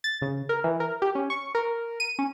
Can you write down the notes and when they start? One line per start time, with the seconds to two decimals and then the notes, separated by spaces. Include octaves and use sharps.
0.04 A6
0.22 C#3
0.49 A#4
0.64 E3
0.80 A#4
1.02 G4
1.15 C#4
1.30 C#6
1.55 A#4
2.00 D#7
2.19 C#4